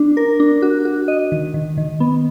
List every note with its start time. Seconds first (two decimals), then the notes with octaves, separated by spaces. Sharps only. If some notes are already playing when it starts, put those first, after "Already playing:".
Already playing: D4
0.17 A#4
0.40 D4
0.62 F#4
0.85 F#4
1.08 D#5
1.32 D#3
1.54 D#3
1.78 D#3
2.00 B3